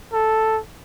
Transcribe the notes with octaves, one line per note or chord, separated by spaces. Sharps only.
A4